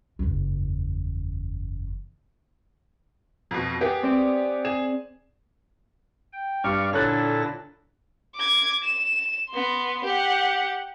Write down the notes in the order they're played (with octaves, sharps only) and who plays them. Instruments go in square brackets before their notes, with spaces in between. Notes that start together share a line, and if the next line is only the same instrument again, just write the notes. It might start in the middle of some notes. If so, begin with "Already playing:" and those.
[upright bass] F#1 E2
[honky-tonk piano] F2 B2
B3 G4 G#4
[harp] C4 D5
[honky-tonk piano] G#4 E7
[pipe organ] G5
[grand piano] G2 [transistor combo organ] D5 F5 [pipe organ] C#6
[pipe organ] A#2 E4 A#6 [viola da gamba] D3 [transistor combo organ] A4 [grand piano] C#5 F#6 A6
[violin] D6 G#6
E7
B3 C6
G4 F#5